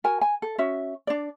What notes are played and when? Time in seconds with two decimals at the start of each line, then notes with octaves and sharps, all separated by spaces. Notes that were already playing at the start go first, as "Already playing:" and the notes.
0.04 F#4 A#4 G#5
0.21 G#5
0.42 A4
0.58 C#4 F#4 E5
1.07 D4 D5